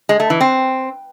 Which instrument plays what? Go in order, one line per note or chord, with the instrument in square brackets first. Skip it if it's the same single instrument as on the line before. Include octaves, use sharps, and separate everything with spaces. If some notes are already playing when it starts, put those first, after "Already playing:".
[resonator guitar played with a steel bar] G#3
A3
E3
C4